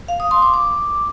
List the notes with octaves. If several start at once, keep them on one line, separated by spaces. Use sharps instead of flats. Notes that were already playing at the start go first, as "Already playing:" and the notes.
F5
D#6
C6
D6
D6